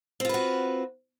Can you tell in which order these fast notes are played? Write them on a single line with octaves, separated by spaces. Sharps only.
C4 F4 B4 F#4